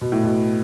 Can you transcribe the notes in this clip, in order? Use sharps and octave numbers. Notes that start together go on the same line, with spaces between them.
B2
A2
B2